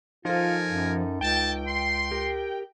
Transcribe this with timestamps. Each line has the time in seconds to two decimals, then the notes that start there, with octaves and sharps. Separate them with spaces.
0.25 F3 D#4 F4 A4 A#4 G#5
0.69 F#2
1.21 C#2 G5 A5
1.67 C6
2.11 G4 A#4